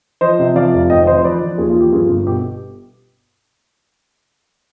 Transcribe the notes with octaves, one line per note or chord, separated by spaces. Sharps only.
F3 C5 D#5
C3
F3 D5 F5
F1
G#1 D#5 G5
F3 C5 D#5
C5
F3 B4 D5
F3
D#2 F4 G#4
F4
F3 G4
G2 F4 G#4
G1 F4
B2 G4